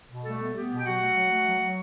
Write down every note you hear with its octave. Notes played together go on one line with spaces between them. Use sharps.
B2
G3 A3 A4
B3
B3 G4
B2
G5
F#3 F#4 F#5
A3
F#3
A3
F#3
F#3